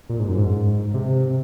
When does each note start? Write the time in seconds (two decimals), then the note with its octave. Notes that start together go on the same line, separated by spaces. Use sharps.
0.10 A#2
0.19 G#2
0.28 F#2
0.38 G#2
0.94 C3